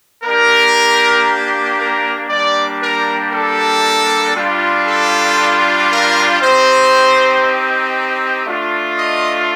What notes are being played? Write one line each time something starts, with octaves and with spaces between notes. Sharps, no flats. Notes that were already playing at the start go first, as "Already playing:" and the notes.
A#3 D4 G4 A#4
A#4
G3 A#3 D4 G4 D5
A#4
A4
G3 D4 F4
A4
A#4
C4 D#4 G4 C5
A3 D4 F4
D#5